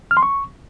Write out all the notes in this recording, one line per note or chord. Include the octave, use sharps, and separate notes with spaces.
F6
C6
C#6